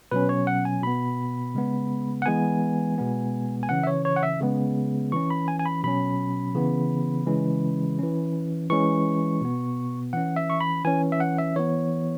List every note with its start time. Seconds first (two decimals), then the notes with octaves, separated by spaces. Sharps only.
0.11 B2 F#3 C#4 B4
0.29 C#5
0.47 F#5
0.65 G#5
0.83 B2 B3 B5
1.55 C#3 G#3 B3
2.22 F#5
2.26 E3 G#3 B3 G#5
2.98 B2 G#3 B3
3.63 G#5
3.69 C#3 E3 C#4 F#5
3.83 E5
3.87 C#5
4.05 C#5
4.16 F#5
4.23 E5
4.41 C#3 G#3 B3
5.12 E3 C#4 C#6
5.30 B5
5.48 G#5
5.59 G#5
5.66 B5
5.83 B2 F#3 C#4 B5
6.55 C#3 E3 B3
7.26 C#3 E3 G#3 C#4
7.99 E3 C#4
8.70 E3 G#3 C#4 C#6
9.41 B2 B3
10.13 E3 C#4 F#5
10.36 E5
10.50 C#6
10.61 B5
10.84 E3 C#4 G#5
11.12 E5
11.20 F#5
11.39 E5
11.56 E3 B3 C#5